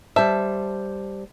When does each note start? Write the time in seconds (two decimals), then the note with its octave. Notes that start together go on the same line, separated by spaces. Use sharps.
0.16 G3 C5 E5 A5